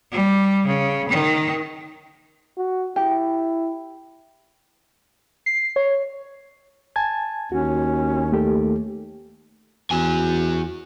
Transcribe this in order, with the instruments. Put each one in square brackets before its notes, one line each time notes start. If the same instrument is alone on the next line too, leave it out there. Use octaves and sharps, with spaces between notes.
[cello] G3
C#3
D#3
[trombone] F#4
[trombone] E4 [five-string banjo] G4
[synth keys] C7
C#5
[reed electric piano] G#5 A5 G#6
[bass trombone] D#2 [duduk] C#4 [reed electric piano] F#4
[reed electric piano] A3 G4 A4
[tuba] E2 [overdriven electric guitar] F#4 G#5